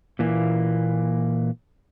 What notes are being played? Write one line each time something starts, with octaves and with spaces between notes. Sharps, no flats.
A#2 E3 A#3